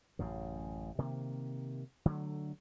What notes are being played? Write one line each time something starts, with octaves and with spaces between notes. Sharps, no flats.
A1 F#2 C#3
C3 D#3 A#3
D3 F#3 A3